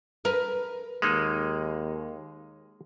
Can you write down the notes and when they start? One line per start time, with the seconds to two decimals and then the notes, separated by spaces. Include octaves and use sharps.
0.25 A#4 B4
1.02 D#2 G#3 A#3 D#4